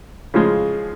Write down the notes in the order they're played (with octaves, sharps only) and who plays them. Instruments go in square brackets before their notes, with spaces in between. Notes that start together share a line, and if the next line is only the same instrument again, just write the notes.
[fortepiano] C#3 F3 G#3